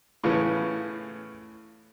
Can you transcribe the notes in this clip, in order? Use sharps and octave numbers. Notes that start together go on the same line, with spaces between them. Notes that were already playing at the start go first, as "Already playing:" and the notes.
A2 C#3 E3 B3 C#4